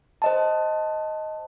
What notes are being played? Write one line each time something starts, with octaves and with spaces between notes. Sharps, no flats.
C5 D#5 A5